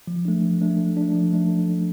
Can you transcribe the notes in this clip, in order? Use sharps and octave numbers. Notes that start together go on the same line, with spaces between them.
F3
A3 D4
F3
A3 D4
F3
D4
A3
F3
A3 D4